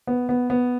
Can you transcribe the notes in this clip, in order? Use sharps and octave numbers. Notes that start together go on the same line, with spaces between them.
B3
B3
B3